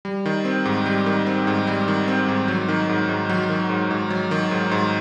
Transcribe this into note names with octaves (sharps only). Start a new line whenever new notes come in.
G3
D#3
C4
G#2
G3
D#3
C4
G#2
G3
D#3
C4
G#2
F#3
D#3
G#2
G#2
F#3
D#3
G#2
G#2
F#3
D#3
G#2
G#2